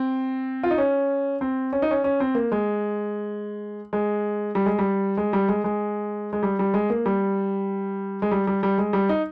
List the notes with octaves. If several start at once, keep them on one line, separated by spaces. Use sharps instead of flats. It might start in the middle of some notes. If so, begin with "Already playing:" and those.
Already playing: C4
F4
D#4
C#4
C4
C#4
D#4
C#4
C#4
C4
A#3
G#3
G#3
G3
G#3
G3
G#3
G3
G#3
G#3
G#3
G3
G3
G#3
A#3
G3
G#3
G3
G3
G3
G#3
G3
D#4